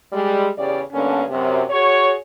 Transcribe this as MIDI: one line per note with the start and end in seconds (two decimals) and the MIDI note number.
0.13 0.48 55
0.13 0.48 56
0.57 0.80 40
0.57 0.80 49
0.57 0.80 67
0.57 0.80 74
0.93 1.24 43
0.93 1.24 50
0.93 1.24 58
0.93 1.24 59
0.93 1.24 61
1.30 1.63 42
1.30 1.63 48
1.70 2.15 66
1.70 2.15 68
1.70 2.15 73